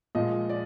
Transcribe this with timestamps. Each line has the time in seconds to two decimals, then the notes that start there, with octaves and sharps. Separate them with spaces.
0.15 A#2 F3 G#3 D#5
0.49 D5